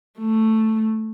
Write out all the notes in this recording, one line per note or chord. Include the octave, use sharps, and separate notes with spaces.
A3